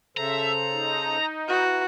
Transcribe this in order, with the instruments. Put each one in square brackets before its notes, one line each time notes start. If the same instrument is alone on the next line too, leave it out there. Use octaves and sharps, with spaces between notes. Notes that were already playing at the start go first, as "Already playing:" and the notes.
[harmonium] C#3 A4 C5 [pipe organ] E5 [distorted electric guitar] A#5
[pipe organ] D#4
[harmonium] E4 B4 A#5 [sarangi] F#4